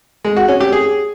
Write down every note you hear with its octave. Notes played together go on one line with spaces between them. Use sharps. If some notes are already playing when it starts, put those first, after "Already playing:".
G#3
F#4
C#4
G4
G#4